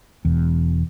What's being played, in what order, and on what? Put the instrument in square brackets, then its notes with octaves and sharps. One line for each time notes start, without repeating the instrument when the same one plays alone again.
[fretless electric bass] E1 E2